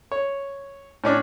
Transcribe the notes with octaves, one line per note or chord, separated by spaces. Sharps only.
C#5
A2 C#4 D4